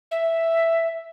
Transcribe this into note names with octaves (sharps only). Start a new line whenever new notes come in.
E5